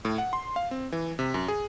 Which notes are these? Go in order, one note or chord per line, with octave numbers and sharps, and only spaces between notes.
A2
F#5
C6
F5
C4
E3
C3
F#2
G#4